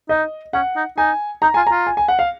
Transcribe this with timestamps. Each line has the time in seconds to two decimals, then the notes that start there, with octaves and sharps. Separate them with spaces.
0.09 D#4 D#5
0.53 C#4 F#5
0.76 D#4
0.97 D#4 G#5
1.42 D#4 A#5
1.54 F4 G#5
1.67 F4 A#5
1.87 G#5
1.97 G#5
2.08 F#5
2.19 F5